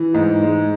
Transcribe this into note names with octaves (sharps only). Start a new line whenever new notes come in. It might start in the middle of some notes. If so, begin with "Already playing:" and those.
Already playing: E3
G#2
G#3